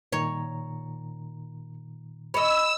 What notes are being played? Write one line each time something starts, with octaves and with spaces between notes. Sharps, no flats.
A#2 D#3 C#5 A#5
C#5 D#5 B5 E6